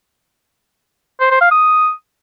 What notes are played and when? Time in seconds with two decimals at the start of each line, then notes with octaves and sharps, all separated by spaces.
1.20 C5
1.31 C5
1.41 F5
1.51 D#6